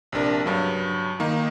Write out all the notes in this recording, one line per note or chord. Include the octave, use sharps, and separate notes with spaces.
A#1 C3 D4 A#4
G2 C#3 F#3
D#3 A#3 D#4